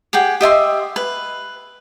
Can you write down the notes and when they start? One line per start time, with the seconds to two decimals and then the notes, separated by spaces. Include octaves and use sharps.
0.13 G4 G#4 F#5 G5
0.41 G4 D#5 E5 C6
0.96 B4